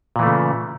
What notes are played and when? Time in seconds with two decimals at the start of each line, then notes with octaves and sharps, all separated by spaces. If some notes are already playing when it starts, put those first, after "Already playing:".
0.16 A#2
0.19 E3
0.23 A3
0.26 C#3